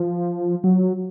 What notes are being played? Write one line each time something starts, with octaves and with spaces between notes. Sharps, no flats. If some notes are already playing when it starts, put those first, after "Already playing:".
Already playing: F3
F#3